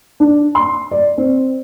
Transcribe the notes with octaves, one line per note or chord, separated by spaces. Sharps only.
D4
C6
D5
C4